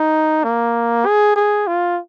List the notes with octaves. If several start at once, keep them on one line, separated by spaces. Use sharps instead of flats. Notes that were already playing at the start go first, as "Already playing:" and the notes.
Already playing: D#4
A#3
G#4
G#4
F4